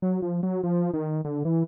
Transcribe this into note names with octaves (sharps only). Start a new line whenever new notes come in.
F#3
F3
F#3
F3
D#3
D3
E3